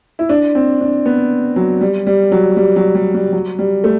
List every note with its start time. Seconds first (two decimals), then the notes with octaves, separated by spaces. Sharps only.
0.19 E4
0.29 D4
0.55 C4
0.81 D4
1.06 B3
1.56 F#3
1.81 G3
2.07 G3
2.32 F#3
2.57 G3
2.76 F#3
2.95 G3
3.14 G3
3.33 F#3
3.59 G3
3.84 A3